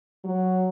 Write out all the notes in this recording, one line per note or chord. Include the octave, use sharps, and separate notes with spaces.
F#3